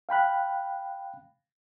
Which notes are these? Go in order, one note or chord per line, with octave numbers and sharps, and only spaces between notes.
F5 G5 B5 F#6